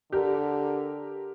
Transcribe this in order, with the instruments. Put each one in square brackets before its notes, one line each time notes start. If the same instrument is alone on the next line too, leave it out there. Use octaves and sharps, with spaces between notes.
[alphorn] D3 [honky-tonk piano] G4 A#4